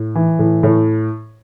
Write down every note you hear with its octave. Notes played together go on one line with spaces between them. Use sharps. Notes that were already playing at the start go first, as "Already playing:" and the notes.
Already playing: A2
E3
A2
A2 C#5